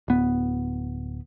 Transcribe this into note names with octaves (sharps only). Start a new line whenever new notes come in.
D1 B3